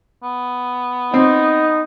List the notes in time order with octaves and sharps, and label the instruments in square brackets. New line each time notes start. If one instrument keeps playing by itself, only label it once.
[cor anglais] B3
[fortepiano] C4 [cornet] D#4